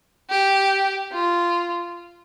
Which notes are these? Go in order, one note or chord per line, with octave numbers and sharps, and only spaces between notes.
G4
F4